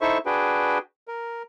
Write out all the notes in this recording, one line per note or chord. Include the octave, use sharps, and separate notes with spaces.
D#4 E4 A4 C5 E5 C#6
D4 F#4 G#4 B4 G5
A#4